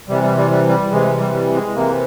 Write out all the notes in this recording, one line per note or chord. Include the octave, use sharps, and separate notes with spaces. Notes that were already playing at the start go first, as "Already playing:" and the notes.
C3 E3 G3
G3
G3
G3
G3
C3 E3 G#3
G3
G3
G#3
C3 E3 A#3